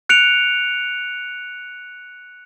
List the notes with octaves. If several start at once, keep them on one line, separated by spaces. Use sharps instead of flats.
F#6 C#7 D7 F7